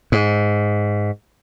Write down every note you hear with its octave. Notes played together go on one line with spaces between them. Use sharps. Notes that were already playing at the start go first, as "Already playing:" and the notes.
G#2